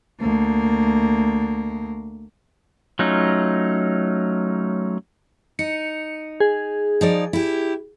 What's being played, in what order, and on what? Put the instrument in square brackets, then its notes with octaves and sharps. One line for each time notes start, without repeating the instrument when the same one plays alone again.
[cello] D2 A#3
[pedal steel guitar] F#3 A3 C#4 D#4 F4
[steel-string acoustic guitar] D#4 [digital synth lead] C#7
[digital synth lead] G#4
[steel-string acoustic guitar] F3 D#4 D5
E4 G4